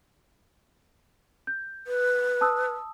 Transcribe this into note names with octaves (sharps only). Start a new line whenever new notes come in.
G6
B4
A5 D#6 E6